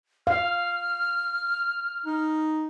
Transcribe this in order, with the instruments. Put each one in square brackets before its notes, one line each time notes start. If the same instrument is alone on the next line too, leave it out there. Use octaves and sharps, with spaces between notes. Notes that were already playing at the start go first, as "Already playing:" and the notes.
[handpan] F5 [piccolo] F6
[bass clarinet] D#4